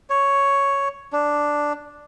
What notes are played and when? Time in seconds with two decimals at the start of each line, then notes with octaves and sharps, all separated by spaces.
0.10 C#5
1.13 D4